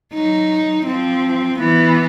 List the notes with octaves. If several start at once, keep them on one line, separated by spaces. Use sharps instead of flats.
F#3 D#4
F3 C4
E3 B3